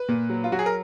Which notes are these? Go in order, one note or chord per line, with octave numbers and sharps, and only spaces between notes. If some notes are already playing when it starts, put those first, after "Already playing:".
Already playing: B4
A#2
F#3
F4
F#3 F#4
G#4
A#4